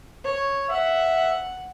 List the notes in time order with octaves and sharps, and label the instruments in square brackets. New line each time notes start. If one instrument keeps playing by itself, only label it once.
[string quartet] C#5
[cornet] E5 [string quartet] F#5